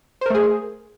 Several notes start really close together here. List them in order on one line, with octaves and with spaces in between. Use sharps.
C5 A#4 A3 G#4